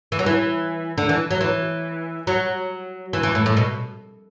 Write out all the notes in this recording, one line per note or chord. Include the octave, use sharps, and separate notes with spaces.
E3
F#3
E3
D3
E3
F#3
E3
F#3
E3
E3
A2
A2
B2